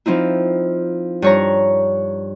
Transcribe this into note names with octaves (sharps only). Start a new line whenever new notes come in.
F3 C4 D#4 E4
G2 C#5 A#5